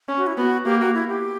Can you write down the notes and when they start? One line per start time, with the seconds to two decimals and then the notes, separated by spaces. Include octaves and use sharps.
0.08 C#4
0.17 F#4
0.27 E4
0.37 B3 F#4
0.66 A#3 G4
0.80 F#4
0.94 E4
1.09 G4